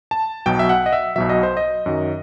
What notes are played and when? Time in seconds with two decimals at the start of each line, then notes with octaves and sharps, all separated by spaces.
0.11 A5
0.46 B1 B2 F#3 G5
0.59 E5
0.69 F#5
0.86 D#5
0.93 E5
1.16 B1 B2 F#3 E5
1.29 D#5
1.43 C5
1.57 D#5
1.86 F#2 D#3 F#3